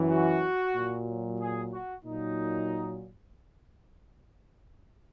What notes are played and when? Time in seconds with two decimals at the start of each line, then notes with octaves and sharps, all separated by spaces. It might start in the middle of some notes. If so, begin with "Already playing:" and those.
Already playing: F#2 E3
0.09 F#4
0.74 A#2 F#3
1.40 G#4
1.73 F#4
2.05 A#2 F#3 D#4